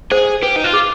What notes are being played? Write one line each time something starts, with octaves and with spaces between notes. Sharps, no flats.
G#4 C5
G4 B4
D#4
F4
G#4